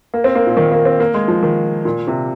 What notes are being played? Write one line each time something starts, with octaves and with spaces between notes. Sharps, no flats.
A#3
C4
A#3
A#2
D#3
A#3
C4
A#3
G#3
F3
D#3
A#2
C3